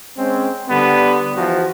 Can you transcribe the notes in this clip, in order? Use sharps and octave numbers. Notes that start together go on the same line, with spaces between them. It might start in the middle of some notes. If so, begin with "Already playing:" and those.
G#3 C4 C#4
D3 G3 B3
E2 F3 F#4